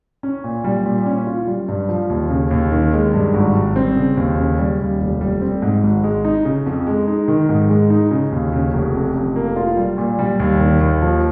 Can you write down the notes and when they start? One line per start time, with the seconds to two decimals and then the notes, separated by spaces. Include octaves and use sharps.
0.23 C#4
0.44 A#2
0.64 G3
0.86 A#2
1.06 C#4
1.27 F4
1.47 G3
1.68 G2
1.89 F3
2.10 D#2
2.30 C#3
2.51 D#2
2.72 D#3
2.93 G#3
3.14 G2
3.34 G#1
3.55 G3
3.76 C4
3.96 C#3
4.17 D#2
4.38 C#3
4.59 G3
4.79 D#2
5.00 F1
5.21 G3
5.42 C4
5.62 G#2
5.83 G#1
6.04 G#3
6.25 D#4
6.45 C#3
6.66 F2
6.87 G#3
7.08 D#4
7.28 D#3
7.49 G#2
7.70 G#3
7.90 D#4
8.11 C#3
8.32 D#2
8.53 C#3
8.73 F1
8.94 F2
9.15 F1
9.36 A#3
9.56 F4
9.77 G3
9.98 A#2
10.19 G3
10.40 D#2
10.60 D#3
10.81 D#2
11.02 F3